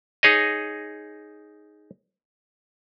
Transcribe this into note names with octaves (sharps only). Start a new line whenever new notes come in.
D#4 G#4 C#5 D#5